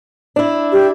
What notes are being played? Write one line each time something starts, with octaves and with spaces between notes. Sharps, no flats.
D4 E4
G4